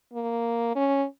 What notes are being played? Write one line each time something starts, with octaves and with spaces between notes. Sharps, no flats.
A#3
C#4